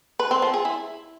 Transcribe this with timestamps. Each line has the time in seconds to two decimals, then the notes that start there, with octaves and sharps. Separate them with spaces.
0.19 B4
0.31 C4
0.42 F3
0.54 G#4
0.65 E4